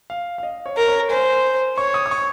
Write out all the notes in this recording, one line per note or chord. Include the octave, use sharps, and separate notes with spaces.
F5
F5
D#5
C#5
A#4
C#5
C5 G#5
C#5 C#6
D#6
D#6
C#6